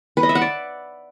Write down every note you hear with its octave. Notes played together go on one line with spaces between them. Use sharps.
B4
D#5
E5
F#5
D5